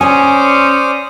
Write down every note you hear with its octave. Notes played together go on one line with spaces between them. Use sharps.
C#4 C5 D5 G#5 D#6